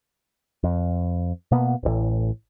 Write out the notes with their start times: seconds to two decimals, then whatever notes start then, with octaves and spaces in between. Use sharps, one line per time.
0.64 F2
1.51 B2 A#3 B3
1.83 D#1 A1 A2